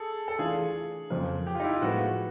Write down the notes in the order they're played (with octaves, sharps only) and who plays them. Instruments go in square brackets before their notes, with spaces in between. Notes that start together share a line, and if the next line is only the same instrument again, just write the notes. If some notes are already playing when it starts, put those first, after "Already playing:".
Already playing: [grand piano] G#4 A4
A4
[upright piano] E3 A3 D4 F4 [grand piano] G#4
[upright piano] F2 C#3 F3 A#3
[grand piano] G4
F4
D#4
E4
F4
[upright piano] A2 F3 G#3 B3 [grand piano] F#4